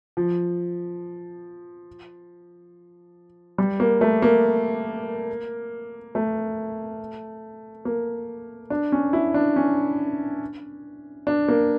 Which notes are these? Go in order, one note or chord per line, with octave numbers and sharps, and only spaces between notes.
F3
G3
A#3
A3
A#3
A3
A#3
D4
C#4
E4
D4
C#4
D4
A#3